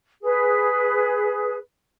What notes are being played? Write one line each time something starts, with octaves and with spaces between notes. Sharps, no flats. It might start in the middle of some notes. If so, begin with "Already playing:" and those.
G#4 B4